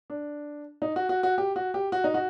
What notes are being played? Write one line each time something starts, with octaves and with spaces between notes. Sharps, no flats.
D4
D#4
F#4
F#4
F#4
G4
F#4
G4
F#4
D#4
F#4